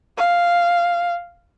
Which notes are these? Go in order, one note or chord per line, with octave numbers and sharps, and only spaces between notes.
F5